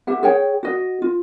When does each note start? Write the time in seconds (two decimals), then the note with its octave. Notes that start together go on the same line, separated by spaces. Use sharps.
0.07 G4 E5 F#5
0.23 G#4 C#5 G5
0.63 F#4 D#5
1.02 F4